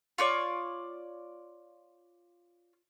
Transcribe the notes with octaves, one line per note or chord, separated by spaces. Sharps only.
F4 C#5 D5